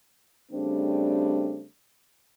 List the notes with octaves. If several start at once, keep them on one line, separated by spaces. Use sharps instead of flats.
C#3 G3 A3 C4 D4